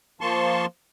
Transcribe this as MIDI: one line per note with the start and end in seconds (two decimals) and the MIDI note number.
0.21 0.66 53
0.21 0.66 58
0.21 0.66 81
0.21 0.66 84
0.21 0.66 85